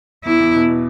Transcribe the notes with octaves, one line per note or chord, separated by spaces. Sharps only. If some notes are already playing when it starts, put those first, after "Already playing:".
E2 E4
E2
B2
B2